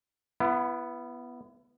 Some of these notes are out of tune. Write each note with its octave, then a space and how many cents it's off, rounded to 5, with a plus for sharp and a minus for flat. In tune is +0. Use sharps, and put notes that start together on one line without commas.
B3 +0 E4 +35